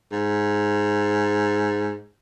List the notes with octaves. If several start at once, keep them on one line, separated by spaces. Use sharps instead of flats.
G#2